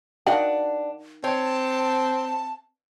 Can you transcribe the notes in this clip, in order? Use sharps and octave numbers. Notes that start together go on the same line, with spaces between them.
D#3 D4 F#4 F5 F#5
C4 C#5 A5